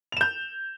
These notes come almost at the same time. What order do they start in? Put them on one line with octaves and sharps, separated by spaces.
F7 E7 G6